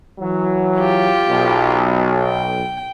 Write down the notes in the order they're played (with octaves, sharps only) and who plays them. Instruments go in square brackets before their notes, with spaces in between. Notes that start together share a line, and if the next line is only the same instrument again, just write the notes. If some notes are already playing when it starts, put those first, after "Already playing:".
[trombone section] E3 F#3
[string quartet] F4 G4
[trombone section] B1
[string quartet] G5